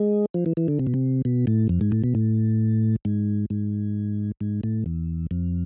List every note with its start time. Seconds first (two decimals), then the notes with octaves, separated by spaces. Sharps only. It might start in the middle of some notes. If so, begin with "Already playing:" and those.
Already playing: G#3
0.34 F3
0.46 E3
0.57 E3
0.68 D3
0.79 C3
0.87 B2
0.94 C3
1.25 B2
1.47 A2
1.69 F2
1.81 G#2
1.92 A2
2.04 B2
2.15 A2
3.05 G#2
3.50 G#2
4.41 G#2
4.63 A2
4.86 E2
5.31 F2